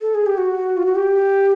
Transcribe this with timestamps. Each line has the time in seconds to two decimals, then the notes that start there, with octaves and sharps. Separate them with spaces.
0.01 A4
0.15 G#4
0.26 G4
0.38 F#4
0.77 F4
0.86 F#4
0.95 G4